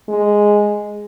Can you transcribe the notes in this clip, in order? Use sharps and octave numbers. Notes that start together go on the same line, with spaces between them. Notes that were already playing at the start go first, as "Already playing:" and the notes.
G#3